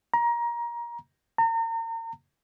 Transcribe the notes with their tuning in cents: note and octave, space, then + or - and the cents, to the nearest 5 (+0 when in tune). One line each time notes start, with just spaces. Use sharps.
A#5 +25
A#5 -35